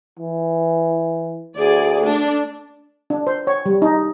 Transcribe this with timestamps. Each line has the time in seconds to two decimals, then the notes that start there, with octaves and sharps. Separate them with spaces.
0.19 E3
1.57 D2 G#4 D5
2.05 A3 D4
3.10 D4
3.27 C5
3.47 C#5
3.66 G3
3.82 D#4